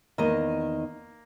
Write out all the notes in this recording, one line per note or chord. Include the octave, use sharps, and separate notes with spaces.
E2 D#3 A#3 D#5